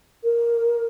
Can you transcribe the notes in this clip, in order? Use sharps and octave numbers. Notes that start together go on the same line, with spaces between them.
A#4